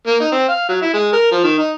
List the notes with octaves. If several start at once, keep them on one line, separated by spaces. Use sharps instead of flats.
A#3
D#4
C4
F5
F#3
E4
G#3
A#4
F3
D#3
D#4